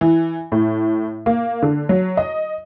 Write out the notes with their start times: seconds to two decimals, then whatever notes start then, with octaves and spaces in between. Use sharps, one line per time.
0.01 E3
0.52 A2
1.26 A#3
1.62 D3
1.89 F#3
2.17 D#5